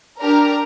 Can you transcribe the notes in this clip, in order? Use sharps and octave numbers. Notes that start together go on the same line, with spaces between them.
D4 G4 A#4 A#5